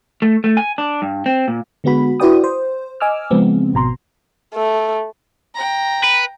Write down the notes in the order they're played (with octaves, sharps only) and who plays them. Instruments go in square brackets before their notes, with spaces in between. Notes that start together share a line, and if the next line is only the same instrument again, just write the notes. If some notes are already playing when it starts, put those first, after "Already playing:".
[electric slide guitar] A3
A3
G#5
D4
G2
C4
A#2
[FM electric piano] D3 G#3 B3 F#4 B5
E4 F#4 B4 D5 G5 D#6
C5
D#5 G#5 D6 E6 F6
C#3 F3 G#3 B3 C4
G#1 B2 A#5 C6
[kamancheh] A3
[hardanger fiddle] G5 A#5
[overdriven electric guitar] B4